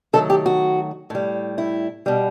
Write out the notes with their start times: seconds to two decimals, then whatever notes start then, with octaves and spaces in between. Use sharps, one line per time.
0.13 D#3 F#3 A3 A4
0.30 G4
0.46 F#4
1.10 A2 G3
1.58 E4
2.06 B2 G3